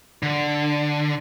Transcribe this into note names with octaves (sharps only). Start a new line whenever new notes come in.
D3